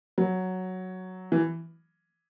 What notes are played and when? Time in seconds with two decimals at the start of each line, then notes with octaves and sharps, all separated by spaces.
0.18 F#3
1.32 E3